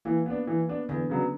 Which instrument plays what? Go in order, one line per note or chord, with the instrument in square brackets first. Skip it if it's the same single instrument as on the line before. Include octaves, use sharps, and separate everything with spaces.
[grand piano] E3 [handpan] A#3
[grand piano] B3 D4
E3
B3 D4
[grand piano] E2 [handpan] D3
[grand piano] C#3 F#3 B3 D4